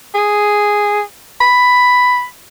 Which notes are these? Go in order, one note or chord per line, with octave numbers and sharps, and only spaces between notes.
G#4
B5